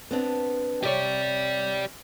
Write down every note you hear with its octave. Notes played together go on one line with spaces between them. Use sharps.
B3 C4 D4
C3 G4 C#5 D5